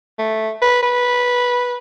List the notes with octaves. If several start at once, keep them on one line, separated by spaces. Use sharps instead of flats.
A3
B4
B4